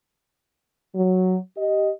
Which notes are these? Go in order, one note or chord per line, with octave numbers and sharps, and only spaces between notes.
F#3
G4 D#5